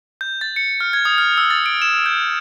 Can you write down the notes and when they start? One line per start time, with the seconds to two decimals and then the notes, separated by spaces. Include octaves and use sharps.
0.21 G6
0.41 A6
0.56 C#7
0.81 F6
0.93 G#6
1.05 D#6
1.18 F6
1.38 E6
1.50 A6
1.66 D7
1.82 E7
2.06 G6